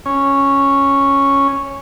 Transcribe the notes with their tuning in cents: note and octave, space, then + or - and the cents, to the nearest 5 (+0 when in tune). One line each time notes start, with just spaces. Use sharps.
C#4 -5